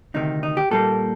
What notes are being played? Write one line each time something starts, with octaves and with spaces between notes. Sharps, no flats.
D2 C3 D#3 D#4
D#4
G4
A#2 G3 A#3 A4